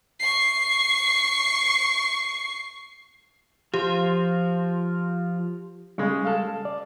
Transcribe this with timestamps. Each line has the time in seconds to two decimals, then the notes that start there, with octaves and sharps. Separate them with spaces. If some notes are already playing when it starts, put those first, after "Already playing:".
0.20 C#6 C7
3.74 F3 F4 G4
5.98 C#3 G3 G#3
6.25 A4 F5
6.65 D5